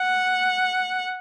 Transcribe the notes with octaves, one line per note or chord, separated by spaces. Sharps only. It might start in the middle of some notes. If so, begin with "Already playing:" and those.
Already playing: F#5